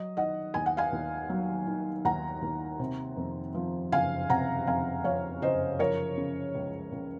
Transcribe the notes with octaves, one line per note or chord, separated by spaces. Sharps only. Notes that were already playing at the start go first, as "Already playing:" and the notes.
Already playing: F#3 D#5
D#3 D#5 F#5
D#2 G#5
F#5
F5 G#5
D#2
F#3
D#3
D#2 F#5 A#5
D#2
C3
F2
F3
F#1 F5 G#5
C3 F#5 A#5
F2 F5 G#5
F3 C#5 F5
F#1 C5 D#5
F3 A#4 C#5
C#3
C#2
C#2